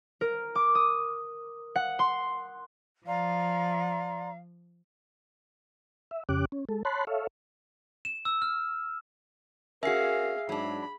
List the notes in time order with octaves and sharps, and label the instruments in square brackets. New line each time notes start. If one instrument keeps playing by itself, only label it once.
[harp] A#4
D6
D#6
F#5
C6
[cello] F3 [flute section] D5 A#5 C6 [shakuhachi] F5
[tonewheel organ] E5
F2 C#3 C#4 G4 D6 F#6
C#4
G#3 A4
C#5 A5 B5 C6 F#6
A4 C#5 E5 F5
[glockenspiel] E7
E6
F6
[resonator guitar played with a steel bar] C#4 F#4 [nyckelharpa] G#4 F5 [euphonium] A#4 [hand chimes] E5 C7
[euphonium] G#2 [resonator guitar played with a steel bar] F#3 D4 [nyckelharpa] B5